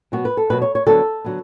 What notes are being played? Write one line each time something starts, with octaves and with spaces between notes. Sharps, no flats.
B2 F#3 B3 F#4
B4
A4
B2 F#3 B3 B4
C#5
C#5
D3 F#3 B3 A4
D3 F#3 B3